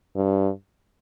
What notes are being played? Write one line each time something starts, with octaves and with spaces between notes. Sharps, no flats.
G2